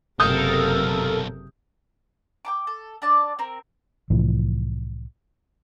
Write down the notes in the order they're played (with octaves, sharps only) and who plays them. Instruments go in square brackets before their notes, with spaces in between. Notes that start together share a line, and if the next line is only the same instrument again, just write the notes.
[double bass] F#1 C3 [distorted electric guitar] B1 F5 [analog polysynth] A4 A#4 [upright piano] D#6 G6
[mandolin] G5 A5 D6
A4
D4 D5 A5
C4 A#4
[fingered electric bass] C2 A2 E3 F3